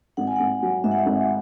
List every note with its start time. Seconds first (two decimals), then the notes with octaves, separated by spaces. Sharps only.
0.17 G#1 F#5
0.27 G#5
0.36 G#1 F#5
0.63 F#3
0.84 G#2 E5
0.91 F#5
0.98 E5
1.06 G#1